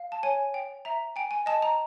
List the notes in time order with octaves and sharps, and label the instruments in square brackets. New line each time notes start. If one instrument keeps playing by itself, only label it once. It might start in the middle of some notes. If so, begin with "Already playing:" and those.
Already playing: [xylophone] F5
A5
C#5 G#5
G5
E5 A#5
G5 G#5
G#5
D#5 A5
A#5